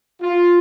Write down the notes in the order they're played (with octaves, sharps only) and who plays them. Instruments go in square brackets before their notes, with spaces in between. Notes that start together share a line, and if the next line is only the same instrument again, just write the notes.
[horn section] F4